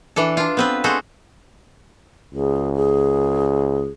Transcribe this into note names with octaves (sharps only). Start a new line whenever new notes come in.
E3 D4 A4
D4 F4
B3 C4 B4
G#3 F#4 A4 C5
C#2 G#4
G#4